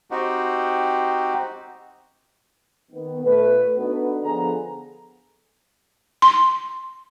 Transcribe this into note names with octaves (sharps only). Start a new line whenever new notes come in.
C4 D#4 F#4 G4
D#3 B3
A#2 A3 B4
B3 D4 D#4 F#4 A4 B4
D3 F3 B3 G#4 A4 A#5
C6